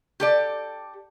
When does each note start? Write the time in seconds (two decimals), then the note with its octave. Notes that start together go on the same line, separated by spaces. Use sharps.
0.20 G4 A4 D5